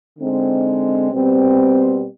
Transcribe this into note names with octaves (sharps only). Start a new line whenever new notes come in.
D3 G#3 C4 D#4
B2 G3 C4